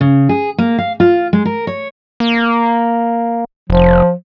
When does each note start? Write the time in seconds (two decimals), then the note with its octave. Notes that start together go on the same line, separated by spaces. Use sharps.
0.01 C#3
0.29 G#4
0.58 A#3
0.78 F5
1.00 F4
1.33 G#3
1.45 A#4
1.67 C#5
2.20 A#3
3.70 F1 F3